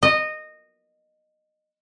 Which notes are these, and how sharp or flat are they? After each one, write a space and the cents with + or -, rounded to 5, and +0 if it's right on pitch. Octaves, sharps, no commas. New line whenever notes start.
D#5 -15